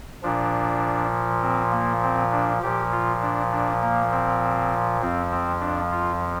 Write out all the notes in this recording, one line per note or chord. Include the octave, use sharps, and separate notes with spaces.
A#2 F3 D4
C4
A#3
C4
D4
A#2 F3 G4
F4
D4
D4
A#3
C4
F2 F3 C4
C4
D4
F4